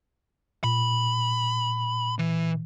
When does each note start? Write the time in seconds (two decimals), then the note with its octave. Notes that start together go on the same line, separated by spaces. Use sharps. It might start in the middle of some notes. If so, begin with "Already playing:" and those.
0.64 A#2 B5
2.19 E3